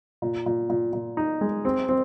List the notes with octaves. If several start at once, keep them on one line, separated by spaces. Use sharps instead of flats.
A#2
A#2
A#2
A#2
D#4
G#3
C4
C4